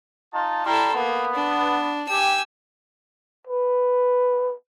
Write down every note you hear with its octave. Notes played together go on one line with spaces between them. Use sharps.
D#4 F4 A5
G3 E4 A4 A#5 C6
A#3 B3
D4
G4 G#5 E6
B4